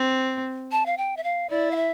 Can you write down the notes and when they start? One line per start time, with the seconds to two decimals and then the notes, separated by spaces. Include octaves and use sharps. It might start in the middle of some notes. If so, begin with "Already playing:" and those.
Already playing: C4
0.72 A5
0.86 F5
0.98 G5
1.17 E5
1.24 F5
1.50 E4 D5
1.71 F5
1.76 E5